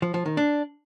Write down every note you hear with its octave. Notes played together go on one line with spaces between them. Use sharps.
F3
F3
D#3
D4